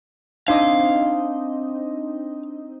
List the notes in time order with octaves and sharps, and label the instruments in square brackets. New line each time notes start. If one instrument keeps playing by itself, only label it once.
[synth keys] C4 D#4 D#5 [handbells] D4 C6 D6 [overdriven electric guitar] F5